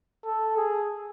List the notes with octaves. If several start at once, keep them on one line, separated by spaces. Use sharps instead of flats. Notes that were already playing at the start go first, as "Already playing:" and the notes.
A4
G#4